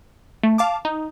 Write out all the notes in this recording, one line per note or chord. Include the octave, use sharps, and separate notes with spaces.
A3
F5 A5 D6
D#4